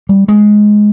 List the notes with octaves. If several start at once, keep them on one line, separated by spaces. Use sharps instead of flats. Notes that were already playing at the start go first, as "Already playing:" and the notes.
G3
G#3